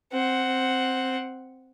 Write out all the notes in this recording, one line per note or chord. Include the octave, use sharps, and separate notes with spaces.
C4 F#5